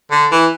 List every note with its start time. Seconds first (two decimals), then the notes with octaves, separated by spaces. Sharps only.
0.11 D3
0.32 E3